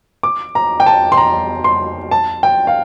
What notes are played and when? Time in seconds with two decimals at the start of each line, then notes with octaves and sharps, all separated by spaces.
0.23 D6
0.55 A#5
0.80 G5
0.86 A5
1.12 C6
1.17 A#5
1.64 C6
2.11 A5
2.43 G5
2.67 F5